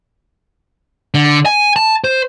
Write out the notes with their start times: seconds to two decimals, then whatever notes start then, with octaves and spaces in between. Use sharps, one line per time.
1.14 D3
1.46 G#5
1.76 A5
2.04 C5